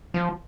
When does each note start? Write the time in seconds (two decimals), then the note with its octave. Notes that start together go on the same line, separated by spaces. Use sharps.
0.14 F3